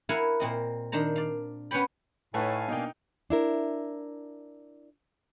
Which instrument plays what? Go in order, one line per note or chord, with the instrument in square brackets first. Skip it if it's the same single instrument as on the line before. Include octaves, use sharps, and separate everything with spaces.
[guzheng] E4 A#4 F5 F#5 G#5
A#2 C4 D#5
D#3 D4 C5 A#5
D5 F5
B3 C#4 B4 C#5 G5 B5
[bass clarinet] A2 [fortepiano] A3 B4 [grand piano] D#4 C#5 [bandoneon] F5 G#5
[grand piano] B2 A#3 D4 [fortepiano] D#4 G5
[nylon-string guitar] D4 E4 A#4